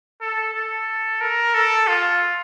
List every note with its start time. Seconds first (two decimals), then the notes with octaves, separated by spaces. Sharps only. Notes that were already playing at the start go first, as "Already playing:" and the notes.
0.21 A4
0.54 A4
1.21 A#4
1.54 A4
1.87 F4